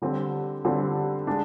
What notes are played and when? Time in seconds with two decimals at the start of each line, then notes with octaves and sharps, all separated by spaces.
0.02 D3 G3 C4
0.65 D3 G3 C4
1.27 G#3 D4